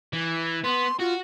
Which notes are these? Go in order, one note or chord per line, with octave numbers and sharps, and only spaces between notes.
E3
B3 C6
F4 F#4